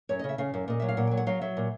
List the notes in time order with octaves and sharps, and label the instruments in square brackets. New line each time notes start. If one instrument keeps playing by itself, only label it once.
[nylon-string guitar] F#2 C#5
D#5
C#3
E5
C#3 F5
F#2
A#2 D#5
F#3 E5
F5
A#2 F#5
F#3 G5
F#5
F#3 F5
F#3 E5
A#2